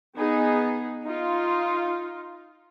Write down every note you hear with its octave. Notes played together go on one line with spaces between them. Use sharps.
B3 D#4 G#4
D#4 F4